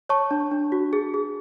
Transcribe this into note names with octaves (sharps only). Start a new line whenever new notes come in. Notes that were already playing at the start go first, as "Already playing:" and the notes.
C#5 A5 C#6
D4
D4
F#4
G#4
G#4